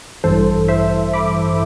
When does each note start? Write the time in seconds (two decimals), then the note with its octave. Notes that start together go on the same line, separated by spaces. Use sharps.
0.24 A1 G2 E3 A4 C5
0.68 C5 E5
1.13 B5 D6